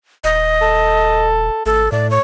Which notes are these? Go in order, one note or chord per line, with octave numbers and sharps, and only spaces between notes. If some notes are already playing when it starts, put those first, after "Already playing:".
D#1 D#5
A4
G#1 A3 A4
A2 A3 D5
C#5